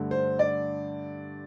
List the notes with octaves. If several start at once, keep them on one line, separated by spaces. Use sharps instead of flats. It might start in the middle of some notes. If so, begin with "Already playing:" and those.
Already playing: G2 D3 A3
C5
D5